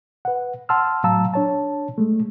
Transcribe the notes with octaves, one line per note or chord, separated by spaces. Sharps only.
B4 F#5
F#5 A5 C6 E6 F6
A2 F#3 F5 A5 A#5 E6
D4 C#5 A5
G#3 A3